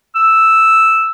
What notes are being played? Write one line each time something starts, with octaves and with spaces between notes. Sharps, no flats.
E6